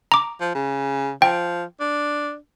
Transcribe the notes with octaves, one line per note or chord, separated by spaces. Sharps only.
A#5 D6
F3
C#3
F3 G5
D4